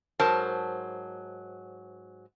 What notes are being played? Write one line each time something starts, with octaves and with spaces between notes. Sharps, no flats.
G#2 F#3 A#4 C5 A5